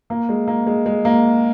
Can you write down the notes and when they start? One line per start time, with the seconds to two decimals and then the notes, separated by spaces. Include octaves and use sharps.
0.10 A#3
0.29 G#3
0.47 A#3
0.67 G#3
0.86 G#3
1.05 A#3